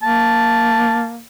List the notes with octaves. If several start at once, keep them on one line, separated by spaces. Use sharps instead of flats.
A#3 A5